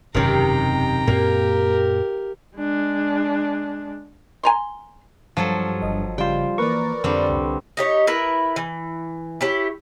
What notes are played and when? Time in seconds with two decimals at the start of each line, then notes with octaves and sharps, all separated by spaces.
0.15 E1 F#2 C3 D#3 C#4 G5 A#5
1.07 F#2 A#2 A#3 G4 A#4
2.56 G#3 D4
4.43 G#5 A#5 C6
5.37 G2 F3 F#3 A4 F5
5.82 G1 D#5
6.18 C#3 G3 F4 C5 G5
6.58 E3 A#3 A#4 B4 D5 A#5 C#6
7.04 F2 D3 G3 C4
7.29 C2
7.77 D#4 G4 C#5
8.07 E4 A#4 B4
8.56 E3
9.41 E4 G4 C#5